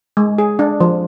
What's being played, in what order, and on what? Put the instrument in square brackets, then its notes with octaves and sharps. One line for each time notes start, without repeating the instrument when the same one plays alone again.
[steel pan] G#3
G#4
D4
F3